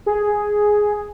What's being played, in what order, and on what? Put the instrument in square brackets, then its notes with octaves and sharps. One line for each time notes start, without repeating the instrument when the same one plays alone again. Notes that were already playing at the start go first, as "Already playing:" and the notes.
[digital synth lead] G#4